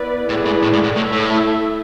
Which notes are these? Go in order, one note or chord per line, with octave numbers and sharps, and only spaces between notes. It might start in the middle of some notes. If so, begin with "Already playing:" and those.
Already playing: B3 E4 B4 D5
A2 A3 E4 G#4 B4 D5
G#2
A2
G#2
A2
A2 A3 E4 A4 E5
A2